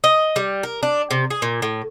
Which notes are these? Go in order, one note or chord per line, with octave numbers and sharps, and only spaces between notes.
D#5
G3
A#4
D4
C3
G#4
A#2
A2